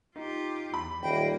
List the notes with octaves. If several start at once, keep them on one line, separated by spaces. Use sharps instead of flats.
D#4 F4 G4
E2 B5
D#1 A#3 A#4 G5